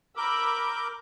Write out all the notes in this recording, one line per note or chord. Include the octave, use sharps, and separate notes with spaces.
A#4 B5 D6 E6 G6